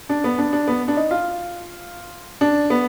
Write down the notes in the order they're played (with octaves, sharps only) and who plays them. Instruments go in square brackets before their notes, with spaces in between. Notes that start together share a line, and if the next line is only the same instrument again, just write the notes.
[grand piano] D4
B3
D4
D4
B3
D4
D#4
F4
D4
B3